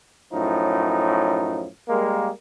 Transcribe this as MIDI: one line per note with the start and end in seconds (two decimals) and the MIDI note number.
0.33 1.65 42
0.33 1.65 45
0.33 1.65 53
0.33 1.65 63
1.87 2.29 55
1.87 2.29 56
1.87 2.29 58